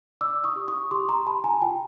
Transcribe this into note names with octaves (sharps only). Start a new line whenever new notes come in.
D5 D6 E6
C#6 D#6
G4
C#6 D#6
G4 C6 D6
A#5 C6
G4 A5 B5
G#5 A#5
F4 G5 A5